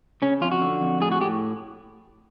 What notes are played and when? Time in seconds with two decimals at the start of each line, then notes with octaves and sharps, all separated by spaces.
0.22 C#3 C#4
0.41 F2 F4
0.52 F#4
0.61 D3
0.81 F2
1.01 A2 G#4
1.12 F#4
1.21 A2 G4